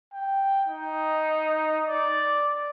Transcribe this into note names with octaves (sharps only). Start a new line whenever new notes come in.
G5
D#4
D5